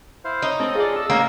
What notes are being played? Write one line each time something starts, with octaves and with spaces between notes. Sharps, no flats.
E4 C5 F5
D#4 C#5
C4 A4 D#5
F4 G#4 D5
E6
A1 A#3 C#4 D#5 F5